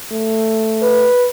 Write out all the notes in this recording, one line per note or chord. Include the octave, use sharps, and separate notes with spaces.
A3
B4